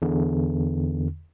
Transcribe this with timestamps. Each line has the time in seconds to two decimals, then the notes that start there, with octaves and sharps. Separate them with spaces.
0.02 E2 D3